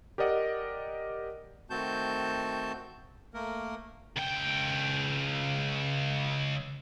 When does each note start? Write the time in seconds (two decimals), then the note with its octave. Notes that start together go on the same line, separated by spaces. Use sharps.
0.18 G4 A#4 D5 D#5 F#5
1.70 D#3 A3 C4 F#4 A5 G6
3.34 A3 A#3 A#4
4.16 C#2 G5